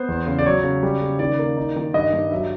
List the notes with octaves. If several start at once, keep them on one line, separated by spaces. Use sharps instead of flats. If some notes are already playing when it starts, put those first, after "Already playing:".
Already playing: B3 C5
E2
C#3
D5
F#3 C#5
C#3
G3
C#3
D#3 D5
A#3
D#4
D#3
G2 D#5
G2
F#3 E5